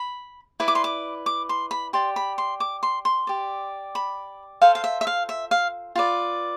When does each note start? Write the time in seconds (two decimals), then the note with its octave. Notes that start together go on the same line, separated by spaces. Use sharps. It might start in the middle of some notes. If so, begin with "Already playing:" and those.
Already playing: B5
0.60 E4 B4 D5
0.68 D6
0.75 C6
0.84 D6
1.26 D6
1.49 C6
1.71 B5
1.93 G4 D5 C6
2.16 B5
2.38 C6
2.60 D6
2.83 C6
3.05 C6
3.27 G4 D5
3.95 B5
4.61 F4 A4 C5 F5
4.75 F5
4.84 E5
5.01 E5
5.07 F5
5.29 E5
5.51 F5
5.95 F4 B4 D5